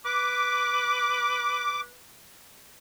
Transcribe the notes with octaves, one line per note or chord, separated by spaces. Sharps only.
B4 D6